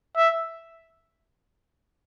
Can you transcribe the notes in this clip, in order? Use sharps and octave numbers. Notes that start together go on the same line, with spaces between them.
E5